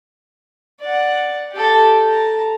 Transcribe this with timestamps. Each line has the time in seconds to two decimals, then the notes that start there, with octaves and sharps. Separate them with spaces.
0.81 D5 F#5
1.52 G4 A4
2.08 A5 A#5